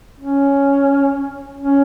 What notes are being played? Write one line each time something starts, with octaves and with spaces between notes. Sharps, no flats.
C#4
C#4